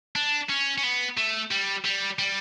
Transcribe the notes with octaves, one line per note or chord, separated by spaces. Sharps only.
D4
C#4
C#4
B3
A3
G3
G3
G3